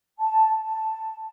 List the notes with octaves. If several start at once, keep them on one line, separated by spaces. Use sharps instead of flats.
A5
A5